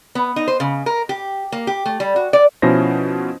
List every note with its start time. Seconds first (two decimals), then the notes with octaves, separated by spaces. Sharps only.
0.15 B3
0.36 D#4
0.48 C5
0.60 C#3
0.86 A#4
1.09 G4
1.52 A#3
1.67 G4
1.86 A3
2.00 G3
2.16 F#4
2.33 D5
2.62 B2 F3 C#4 E4 C5 A#6